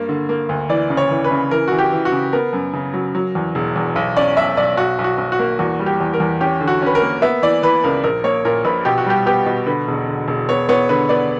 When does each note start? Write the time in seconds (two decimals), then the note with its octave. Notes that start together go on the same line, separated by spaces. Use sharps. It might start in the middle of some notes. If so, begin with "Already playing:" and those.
Already playing: G2 A#3
0.09 D3
0.29 A#3
0.49 D2
0.69 E3 D5
0.90 C#3
0.97 C#5
1.11 E3
1.24 B4
1.32 C#3
1.51 E3 A#4
1.68 E3 F#4
1.78 G4
1.92 E3
2.05 F#4
2.12 C#3
2.33 B3 A#4
2.53 F#2
2.73 C#3
2.94 F#3
3.15 F#3
3.35 E2
3.55 E1
3.76 E2
3.96 B1
4.17 C#4 D5
4.37 B1 E5
4.57 B1 D5
4.77 B1 F#4
4.99 B1
5.04 F#4
5.18 B1
5.32 F#4
5.39 A#3
5.59 E2 F#4
5.80 G3
5.86 G4
6.01 E2
6.13 A#4
6.20 E2
6.41 C#4 G4
6.61 D3
6.68 F#4
6.82 C#4 B4
6.95 A#4
7.02 A#3
7.22 B3 E5
7.42 E3 D5
7.63 E3 B4
7.84 C#2 A#4
8.04 A#1 A#4
8.24 A#3 C#5
8.45 A#2 A#4
8.65 A#1 B4
8.85 B2 G4
8.98 F#4
9.06 G3 G4
9.26 B3 G4
9.46 B2
9.66 D3 B4
9.88 E1
10.08 D3
10.28 E1
10.49 B3 C#5
10.69 B3 C#5
10.89 D3 B4
11.09 B3 D5